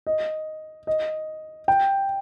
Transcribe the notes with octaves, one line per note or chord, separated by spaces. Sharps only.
D#5
D#5
G5